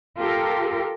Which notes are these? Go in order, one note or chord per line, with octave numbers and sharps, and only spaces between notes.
F4 G4 A4 A#4